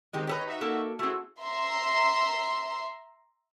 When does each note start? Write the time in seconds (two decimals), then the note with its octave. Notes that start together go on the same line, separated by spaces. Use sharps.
0.13 D#3 G#3 C4 D#4 G4
0.27 G4 A4 B4 C#5 D#5 A#5
0.46 D#4 F#4 E5
0.61 A#3 A4
0.99 A3 C4 E4 F#4 G#4
1.43 E5 A#5 C6